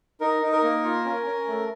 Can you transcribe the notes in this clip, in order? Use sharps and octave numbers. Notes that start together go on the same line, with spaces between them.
D#4 A#4
D#4
A#4
A#3
F4
C#4
C#4
A3